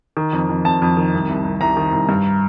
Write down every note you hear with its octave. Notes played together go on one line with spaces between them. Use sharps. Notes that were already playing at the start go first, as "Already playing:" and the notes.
D#3
F2
F2
F2 A5
F2
D#3
C2
C2
C2
C2 A#5
D#3
C2
G2